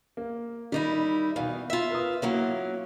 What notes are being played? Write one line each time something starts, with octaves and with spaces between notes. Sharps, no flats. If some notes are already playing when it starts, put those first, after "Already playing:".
A#3
D#3 G3 D#4 E4
B2 E3 F5
F4 E5
A#4 B4 D#6
F#3 A#3 C#4 E4 F5 F#5